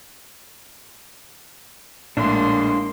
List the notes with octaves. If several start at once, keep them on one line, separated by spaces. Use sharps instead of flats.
A#1 A2 G#3 A#3 D4 C6